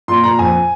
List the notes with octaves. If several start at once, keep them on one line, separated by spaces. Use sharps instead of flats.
A#2 C6
A#2 A#5
F2 G#5